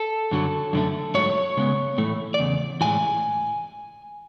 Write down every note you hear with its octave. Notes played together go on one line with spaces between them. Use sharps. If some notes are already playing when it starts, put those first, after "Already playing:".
Already playing: A4
F#2 D3 F#3
F#2 D3 A3
G#2 F#3 A3 C#5
C#3 G#3 B3
A2 E3 A3
D5
E2 C#3
A2 E3 G#3 G#5